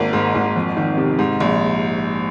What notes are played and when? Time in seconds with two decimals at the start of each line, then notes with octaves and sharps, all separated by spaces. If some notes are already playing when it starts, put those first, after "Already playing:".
Already playing: G#1 A#3
0.13 G#2
0.35 G#1
0.56 F2
0.77 D#3
0.97 C3
1.19 G#2
1.40 A#1